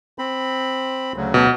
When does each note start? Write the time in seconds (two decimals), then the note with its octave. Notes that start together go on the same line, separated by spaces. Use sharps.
0.19 C4 B5
1.16 D2 C#3 F#3
1.34 B2